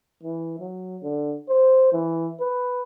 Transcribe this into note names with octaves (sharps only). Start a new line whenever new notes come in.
E3
F#3
D3
C5
E3
B4